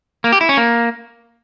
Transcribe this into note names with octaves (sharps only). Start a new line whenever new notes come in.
A#3
G4
E4
C#4
A#3